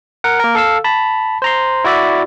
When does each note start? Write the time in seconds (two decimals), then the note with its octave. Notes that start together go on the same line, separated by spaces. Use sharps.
0.24 A#4 F#5
0.40 A#3 A#4
0.55 A4 F5 E6
0.84 A5 B5
1.42 C5 A#5 C6
1.84 E4 F#4 D5 E5